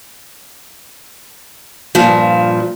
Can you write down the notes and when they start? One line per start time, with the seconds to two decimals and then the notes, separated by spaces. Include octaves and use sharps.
1.95 G2 A#2 F3